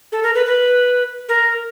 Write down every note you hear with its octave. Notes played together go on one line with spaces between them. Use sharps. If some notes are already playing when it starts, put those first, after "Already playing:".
A4
A#4
B4
B4
A#4